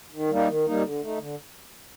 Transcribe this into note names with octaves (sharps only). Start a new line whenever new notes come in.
D#3
G3 A#3 D#4
D#3
G3 A#3 D#4
D3
A3 D#4
D3